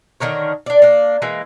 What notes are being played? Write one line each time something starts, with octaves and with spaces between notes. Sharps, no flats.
D3 D#3 A#4 C#5
D4 D5
A#3 D4
E3 G#3 A#3